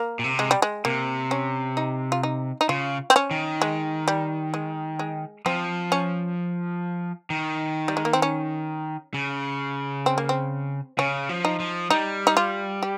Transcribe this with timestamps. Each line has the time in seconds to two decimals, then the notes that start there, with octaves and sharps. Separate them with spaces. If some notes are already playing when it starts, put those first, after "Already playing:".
Already playing: A#3
0.19 A#2
0.24 C3
0.39 G#3
0.51 G3
0.62 G#3
0.85 C3 A#3
1.31 C#4
1.77 D#4
2.12 F4
2.23 D#4
2.61 D#4
2.69 C#3 F4
3.10 C4
3.16 C#4
3.31 D#3
3.62 G#3
4.08 G3
4.54 G#3
4.99 G#3
5.46 F3 C4
5.92 C#4
7.30 D#3
7.88 G3
7.97 G#3
8.05 A#3
8.13 C4
8.22 C#4
9.14 C#3
10.06 C4
10.18 A#3
10.29 C4
10.98 C#3 C#4
11.29 F3
11.45 D#4
11.60 F3
11.90 G3 D#4
12.27 D#4
12.37 F4
12.83 G4